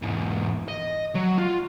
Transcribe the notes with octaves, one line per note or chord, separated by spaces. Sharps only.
E2 G#2
D#5
F#3
F4